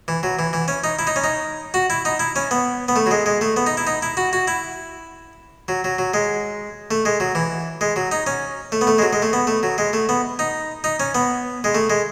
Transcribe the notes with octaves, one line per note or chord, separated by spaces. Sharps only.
E3
F#3
E3
E3
C#4
D#4
E4
D#4
C#4
D#4
F#4
E4
D#4
E4
C#4
B3
B3
A3
F#3
G#3
G#3
A3
B3
D#4
E4
D#4
E4
F#4
F#4
E4
F#3
F#3
F#3
G#3
A3
G#3
F#3
E3
G#3
F#3
D#4
C#4
A3
B3
A3
G#3
F#3
G#3
A3
B3
A3
F#3
G#3
A3
B3
D#4
D#4
C#4
B3
G#3
A3
G#3